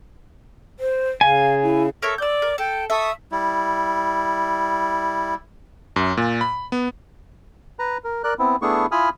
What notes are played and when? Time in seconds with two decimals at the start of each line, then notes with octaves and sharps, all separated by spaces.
0.80 C5
1.21 C#3 F5 G#5
1.63 E4
2.02 A4 A#4 C#5 E5
2.18 D5 D6 E6 G6
2.42 A#4
2.58 A4 G5
2.90 A4 E5 C#6 D#6
3.32 G3 E4
5.96 F#2
6.17 A#2
6.41 B5
6.72 B3
7.79 B4 A#5
8.04 A#4
8.24 A#4 D5 F#6
8.39 B3 C4 E4
8.62 A3 B3 D4 E4 G#4 C#6
8.92 E4 F4 G#5 B5 D#6 F6